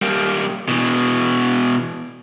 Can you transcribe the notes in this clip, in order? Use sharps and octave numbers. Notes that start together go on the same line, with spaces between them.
G3 A#3
B2 E3